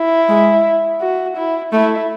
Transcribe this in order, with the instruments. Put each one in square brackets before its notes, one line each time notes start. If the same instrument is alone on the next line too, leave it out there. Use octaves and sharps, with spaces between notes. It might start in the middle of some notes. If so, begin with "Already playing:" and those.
Already playing: [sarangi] E4
[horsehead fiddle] G#3
[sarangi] F#4
E4
[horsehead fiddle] A3 [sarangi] E4